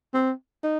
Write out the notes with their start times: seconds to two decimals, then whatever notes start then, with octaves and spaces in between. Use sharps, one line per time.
0.14 C4
0.64 D#4